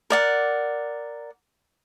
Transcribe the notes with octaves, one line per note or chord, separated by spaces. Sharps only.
A#4 D5 F#5